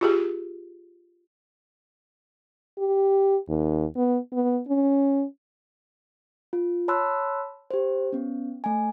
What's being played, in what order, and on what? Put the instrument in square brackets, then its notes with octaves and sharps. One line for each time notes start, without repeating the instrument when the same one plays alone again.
[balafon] F4 G4 G#4
[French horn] G4
D#2
B3
B3
C#4
[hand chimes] F4
C#5 A5 B5 C6 E6 F#6
G4 C5
B3 C#4
A3 G#5